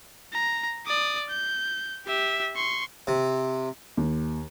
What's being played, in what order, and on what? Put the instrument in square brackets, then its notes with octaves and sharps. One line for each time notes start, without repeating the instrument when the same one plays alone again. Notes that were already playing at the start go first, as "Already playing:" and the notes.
[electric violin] A#5
D5 D#6
G6
G4 E5
C6 C#6
[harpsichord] C3
[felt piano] D#2